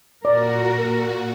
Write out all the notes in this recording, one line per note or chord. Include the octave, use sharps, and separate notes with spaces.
A#2 F#4 A#4 D5